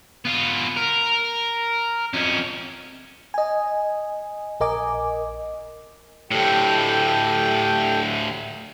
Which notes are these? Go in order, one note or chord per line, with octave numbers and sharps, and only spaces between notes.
B3 F4
A#4
F2 C#4
D#5 G#5
A#1 A#4 D#5 G#5 D6
D2 A2 G4 A4 G5